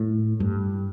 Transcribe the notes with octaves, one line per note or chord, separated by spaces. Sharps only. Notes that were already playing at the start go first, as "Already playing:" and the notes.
Already playing: A2
G2